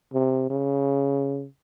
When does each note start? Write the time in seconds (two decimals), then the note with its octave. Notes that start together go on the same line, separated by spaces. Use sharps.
0.14 C3
0.50 C#3